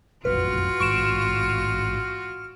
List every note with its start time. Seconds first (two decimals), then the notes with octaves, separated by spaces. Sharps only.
0.25 F1 A#1 F#2 F4 F#4 B4 F6
0.80 A1 G#2 C#6 D7 E7